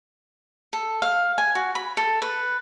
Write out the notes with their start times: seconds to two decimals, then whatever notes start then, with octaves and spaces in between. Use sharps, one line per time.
0.73 A4
1.02 F5
1.38 G#5
1.55 F#4
1.75 B5
1.97 A4
2.22 B4